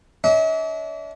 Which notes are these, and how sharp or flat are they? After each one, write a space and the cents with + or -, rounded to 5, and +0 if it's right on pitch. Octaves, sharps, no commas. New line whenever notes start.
D4 -40 E5 -45